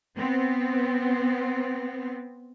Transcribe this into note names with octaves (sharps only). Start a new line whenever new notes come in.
B3 C4